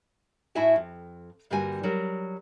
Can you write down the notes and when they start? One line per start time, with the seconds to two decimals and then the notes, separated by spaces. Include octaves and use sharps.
0.55 A2 E4 F#4 E5 G#5 A5
0.76 F2
1.50 G2 D3 G3 A#3 F#4 G#5
1.83 F#3 G3 A#4